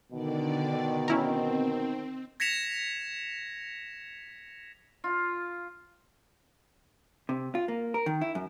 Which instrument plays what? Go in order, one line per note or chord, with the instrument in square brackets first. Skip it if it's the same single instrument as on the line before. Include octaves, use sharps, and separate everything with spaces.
[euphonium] B2 [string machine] D3 D5 [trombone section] D#3
[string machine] C4 [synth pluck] C#4 E4 A#4
[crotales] G#6 A#6 B6 C#7 E7 F7
[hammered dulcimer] F4
[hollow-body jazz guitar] C3
F4
A#3
A#4
D#3
E4
F#2